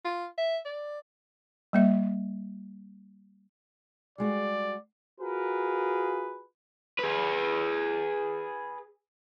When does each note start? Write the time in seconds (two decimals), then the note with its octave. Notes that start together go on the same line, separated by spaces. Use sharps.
0.05 F4
0.38 E5
0.65 D5
1.73 G3 A#3 E5
4.18 G3 G#3 F#4 D5
5.21 F4 F#4 G#4 A#4 B4
6.99 G#4 B4